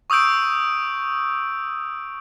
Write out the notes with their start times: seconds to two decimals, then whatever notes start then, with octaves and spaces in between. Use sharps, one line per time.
0.10 C#6 D#6 E6 G6 D7